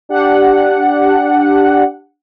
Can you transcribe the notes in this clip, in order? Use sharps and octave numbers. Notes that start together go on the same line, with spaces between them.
D4 G4 F#5